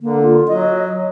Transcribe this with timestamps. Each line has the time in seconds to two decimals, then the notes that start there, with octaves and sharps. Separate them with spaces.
0.01 D3 A#3
0.22 F4
0.48 F#3 D#5